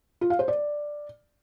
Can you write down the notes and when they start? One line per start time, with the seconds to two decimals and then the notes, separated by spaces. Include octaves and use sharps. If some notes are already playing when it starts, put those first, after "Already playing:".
0.21 F4
0.30 F5
0.39 C5
0.48 D5